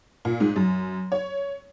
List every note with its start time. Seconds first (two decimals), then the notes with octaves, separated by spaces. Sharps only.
0.25 A#2
0.40 G#2
0.56 F#2
1.12 C#5